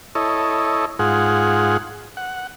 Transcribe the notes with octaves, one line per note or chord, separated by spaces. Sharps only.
E4 A4 C#5 D#5
G#2 F4 G#4 F#5
F#5